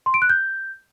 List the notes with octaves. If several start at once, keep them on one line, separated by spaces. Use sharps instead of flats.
C6
D7
F#6
G6